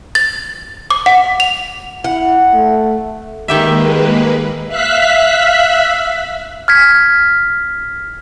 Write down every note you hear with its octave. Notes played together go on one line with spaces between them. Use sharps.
A6
D6
F#5
F7
E4 F#5
A3
D#3 G#3 A#3 G4 B4 E5
E5 F5 F#6 B6
F6 G#6 B6